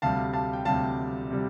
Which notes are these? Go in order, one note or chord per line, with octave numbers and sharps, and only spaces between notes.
D2 C3 G3 F5 A5
F5 A5
G5
D2 C3 G3 F5 A5
C3 G3